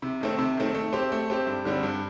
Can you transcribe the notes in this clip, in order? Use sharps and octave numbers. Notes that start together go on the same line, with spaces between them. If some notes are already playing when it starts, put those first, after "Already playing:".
C3
D#3 A3 C4
C3
D#3 A3 C4
A3
C4 G4 C5
A3
C4 G4 C5
G2
D3 G3 C4
G2